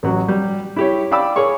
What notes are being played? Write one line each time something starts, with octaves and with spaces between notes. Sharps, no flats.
A1 F#3
G3
E4 G4 C#5
D5 F5 G5 B5 D6 E6
G#4 A#4 C#5 C#6